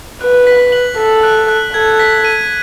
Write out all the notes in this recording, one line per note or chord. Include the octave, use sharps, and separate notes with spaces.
B4 F#6
B6
F#7
A4 B6
F#6
F#6
A4 G#6
B6
D#7